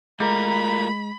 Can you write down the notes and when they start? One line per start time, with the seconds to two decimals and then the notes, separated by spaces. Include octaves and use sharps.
0.20 G#3 A3 F4 A#4 A#5 B5